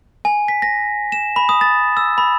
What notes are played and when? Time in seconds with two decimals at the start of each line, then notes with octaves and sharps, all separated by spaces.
0.25 G#5
0.48 B6
0.62 A#6
1.12 E7
1.36 B5
1.49 D#6
1.61 A6
1.97 E6
2.18 B5